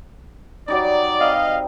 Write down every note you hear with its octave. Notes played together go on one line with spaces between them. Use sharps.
F#3 G3 D#4 D5
C4 D#5 F5